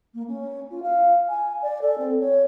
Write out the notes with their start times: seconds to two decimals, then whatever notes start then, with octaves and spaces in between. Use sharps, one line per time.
0.14 A#3
0.28 C#4
0.70 F4
0.82 F5
1.28 G#5
1.62 D5
1.81 A4
1.98 C4
2.20 C#5